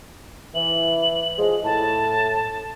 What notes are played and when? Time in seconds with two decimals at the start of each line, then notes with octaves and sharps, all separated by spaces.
0.55 E3 F#7
1.38 F3 G#3
1.64 A2 A5